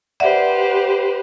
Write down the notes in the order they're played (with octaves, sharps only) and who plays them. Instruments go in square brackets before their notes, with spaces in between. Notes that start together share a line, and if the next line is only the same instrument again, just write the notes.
[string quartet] G4 B4 C5 [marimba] D5 E5 F#5